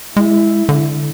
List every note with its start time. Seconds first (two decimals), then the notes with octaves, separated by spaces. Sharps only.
0.17 G#3 E4
0.69 D3